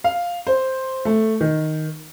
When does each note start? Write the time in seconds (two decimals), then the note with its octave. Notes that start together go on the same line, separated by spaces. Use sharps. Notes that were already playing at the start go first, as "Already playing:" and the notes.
0.04 F5
0.47 C5
1.05 A3
1.41 D#3